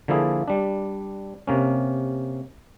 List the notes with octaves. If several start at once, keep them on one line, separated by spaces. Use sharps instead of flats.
D3 F3 A#3 E4 G#4
G3 D4
C3 A#3 C#4